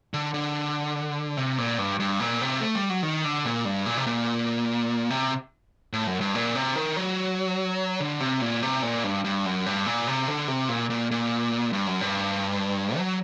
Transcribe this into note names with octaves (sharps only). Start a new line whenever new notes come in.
D3
D3
C3
A#2
G2
G2
A#2
C3
A3
G3
F#3
D#3
D3
A#2
G2
A#2
C3
A#2
C3
A2
F#2
G2
A#2
C3
D#3
F#3
D3
C3
A#2
C3
A#2
G2
G2
F#2
G2
A#2
C3
D3
C3
A#2
A#2
A#2
G2
F#2
G2
F#3